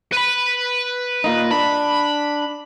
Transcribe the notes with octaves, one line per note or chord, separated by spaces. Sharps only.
B4 B5
A#2 A#3 D#4
D4 B5